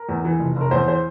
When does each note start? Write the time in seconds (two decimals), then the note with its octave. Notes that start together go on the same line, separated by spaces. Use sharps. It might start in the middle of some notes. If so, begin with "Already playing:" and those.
Already playing: A#4
0.09 E2
0.25 E3
0.40 F1
0.56 F1 A#4
0.71 E2 C5
0.88 E3 C5